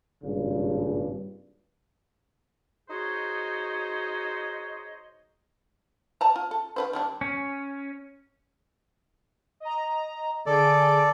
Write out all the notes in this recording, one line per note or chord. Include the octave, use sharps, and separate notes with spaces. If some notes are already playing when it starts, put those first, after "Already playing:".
G#1 G2 A#2 C#3
D#4 F#4 G#4 C5 C#5 D#5
D5 A5 A#5
F4
A4
D#3 B4 C5
D#3 G3 D4
C#4
D#5 A#5
D3 G#4 A4 D5 D7